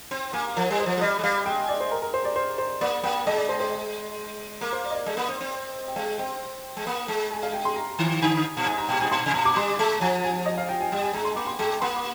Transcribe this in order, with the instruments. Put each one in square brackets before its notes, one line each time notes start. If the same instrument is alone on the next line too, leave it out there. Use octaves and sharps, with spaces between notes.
[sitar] C4 [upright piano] C6
[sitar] A#3 [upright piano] G#5
[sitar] F3 [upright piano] A#4
[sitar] G3
[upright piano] C5
[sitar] F3
G#3
[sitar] G3 [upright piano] D#5
[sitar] G#3
[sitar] G3 [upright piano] F5
[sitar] G#3 [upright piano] G5
[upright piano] D5
C5
A#4
A#4
C5
D5
C5
C5
[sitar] A#3 [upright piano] D5
[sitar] A#3 [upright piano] G5
[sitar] G#3 [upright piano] D#5
[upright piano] D5
C5
C5
[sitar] A#3 [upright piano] A#4
[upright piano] C5
D5
D#5
D5
[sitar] G#3 [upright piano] D#5
[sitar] A#3
C4
C4
[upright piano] G5
[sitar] G#3 [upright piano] F5
[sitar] C4 [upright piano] G5
[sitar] G#3
A#3
G#3
[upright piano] G#5
F5
G5
C6
A#5
[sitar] D#3
[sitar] D3 [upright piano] G#5
[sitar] A#2
[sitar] G#2 [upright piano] G#5
[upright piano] A#5
[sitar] A#2 [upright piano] G5
[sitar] G#2 [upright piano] G#5
[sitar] A#2 [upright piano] C6
[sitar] C3
[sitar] A#2 [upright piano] A#5
[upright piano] D6
[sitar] G3 [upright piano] C6
[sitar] G#3
[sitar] F3 [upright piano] G#5
[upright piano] G#5
D#5
F5
G5
G#5
[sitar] G3 [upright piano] G5
[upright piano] G#5
[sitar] G#3 [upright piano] A#5
[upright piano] C6
[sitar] A#3 [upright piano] D6
[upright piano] C6
[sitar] G#3 [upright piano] G5
[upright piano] D6
[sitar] A#3 [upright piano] C6
[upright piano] D6